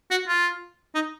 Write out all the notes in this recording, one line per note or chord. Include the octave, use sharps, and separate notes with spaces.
F#4
F4
D#4